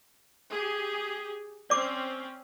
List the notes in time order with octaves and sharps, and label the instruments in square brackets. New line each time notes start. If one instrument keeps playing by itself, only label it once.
[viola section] G4 G#4
[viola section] C4 C#4 [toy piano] D5 D6